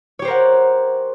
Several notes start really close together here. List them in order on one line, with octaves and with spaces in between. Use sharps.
C#5 G4 C5 A#4 F#5